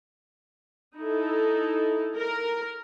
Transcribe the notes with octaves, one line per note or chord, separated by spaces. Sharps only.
D#4 E4 A4
A#4